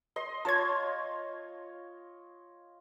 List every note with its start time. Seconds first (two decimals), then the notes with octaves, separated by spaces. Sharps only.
0.16 D#5 C6
0.45 F4 C#5 A5 G#6